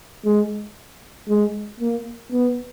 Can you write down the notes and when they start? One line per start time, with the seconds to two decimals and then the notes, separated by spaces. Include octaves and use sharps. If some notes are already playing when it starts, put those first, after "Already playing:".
0.25 G#3
1.28 G#3
1.80 A#3
2.32 B3